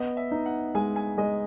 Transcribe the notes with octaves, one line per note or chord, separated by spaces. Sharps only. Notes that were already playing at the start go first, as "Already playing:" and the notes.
Already playing: B3 D#5
E5
D#4
F#5
G#3 G#5
G#5
G#3 D#5